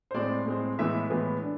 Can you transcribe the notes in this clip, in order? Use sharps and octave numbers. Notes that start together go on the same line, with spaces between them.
C5
A2 G#3 C4 D5
A2 G#3 C4
A2 E3 G#3 B3 E5
A2 E3 G#3 B3
D4